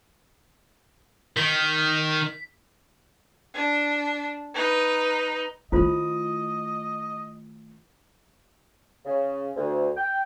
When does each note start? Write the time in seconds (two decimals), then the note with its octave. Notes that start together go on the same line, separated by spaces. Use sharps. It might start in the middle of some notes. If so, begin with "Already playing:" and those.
1.37 D#3 B6
3.56 D4
4.53 D#4 B4
5.72 D#3 A3 E4 F4 C5 D#5
9.05 C#3
9.56 D2
9.97 G5